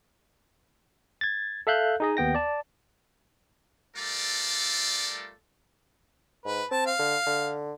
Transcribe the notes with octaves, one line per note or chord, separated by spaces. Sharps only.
G#6 A6
A4 E5 F5 F#6 G6
D#4 G#4 D#5
D#2 B3 G5 A#6
D5 A5
G3 A3 F4 A4 A#4 D5
G#2 B4
C4 A5
F5
D3
D3